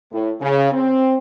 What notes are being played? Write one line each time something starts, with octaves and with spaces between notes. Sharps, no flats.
A2
C#3
C4